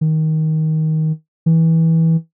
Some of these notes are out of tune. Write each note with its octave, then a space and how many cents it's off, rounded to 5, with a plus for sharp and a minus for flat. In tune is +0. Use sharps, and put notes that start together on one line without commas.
D#3 +15
E3 -20